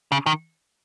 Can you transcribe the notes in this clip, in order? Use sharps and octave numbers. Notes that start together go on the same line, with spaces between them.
C#3
D#3